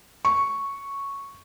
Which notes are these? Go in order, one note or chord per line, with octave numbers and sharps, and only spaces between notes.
C#6